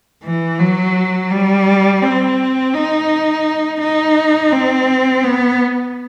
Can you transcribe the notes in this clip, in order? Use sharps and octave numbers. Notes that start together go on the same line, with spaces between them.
E3
F#3
G3
C4
D#4
D#4
C4
B3